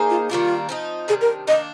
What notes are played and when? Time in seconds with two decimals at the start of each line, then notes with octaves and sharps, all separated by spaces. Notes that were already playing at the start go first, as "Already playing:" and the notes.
Already playing: A#3 D#4 G#4 C5
0.10 F4
0.29 D#3 G3 A#3 D4 F4
0.69 F3 C4 D#4
1.08 C3 D#3 G3 D4 G#4
1.21 A#4
1.47 D#3 A#3 D4 D#5